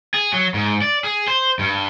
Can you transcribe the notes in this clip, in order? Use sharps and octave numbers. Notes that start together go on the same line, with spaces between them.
G#4
F#3
G#2
D5
G#4
C5
G2